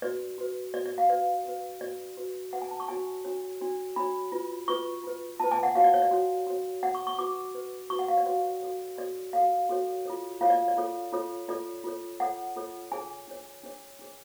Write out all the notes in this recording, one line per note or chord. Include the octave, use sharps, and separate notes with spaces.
F#4 B4 D5
F#4 B4
F#4 B4 D5
D5
F5
F#4 B4 D5
F#4 B4
F#4 B4 D5
F#4 B4
F#4 B4 F#5
G#5
A5
C#6
D4 F#4 C#5 G#5
D4 F#4 C#5
D4 F#4 C#5
D4 F#4 C#5 B5
F4 B4
F4 B4 C#6
F4 B4
F4 B4 A5
G#5
F#5
F#4 C#5 F5
D5
C#5
D5
F#4 C#5
F#4 C#5
F#4 C#5 F#5
C#6
C#6
F#4 B4 D6
F#4 B4
F#4 B4 C#6
F#5
F5
D5
F#4 B4 C#5
F#4 A4 C#5
F#4 A4 C#5 D5
F#4 A4 C#5 F5
F#4 A4 C#5
F4 A4 C#5
F4 A4 C#5 F5
D5
D5
F4 A4 C#5
F4 A4 C#5
F4 A4 C#5 D5
F4 A4 C#5
F4 A4 C#5 F#5
F4 A4 C#5
D4 G#4 C#5 G#5
D4 G#4 C#5
D4 G#4 C#5
D4 G#4 C#5